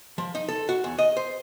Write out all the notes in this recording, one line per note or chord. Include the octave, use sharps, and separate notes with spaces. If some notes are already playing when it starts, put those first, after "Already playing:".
F3
D#4
A4
F#4
E2
D#5
C5